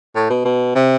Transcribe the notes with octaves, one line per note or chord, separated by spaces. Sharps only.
A2
B2
B2
C3